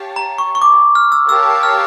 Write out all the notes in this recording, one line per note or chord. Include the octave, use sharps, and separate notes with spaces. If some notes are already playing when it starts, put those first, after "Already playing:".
Already playing: G4 C#5 F5 A5
A#5
C#6
C#6
D6
F6
E6
G4 A#4 C#5 F5 A5 E6
F6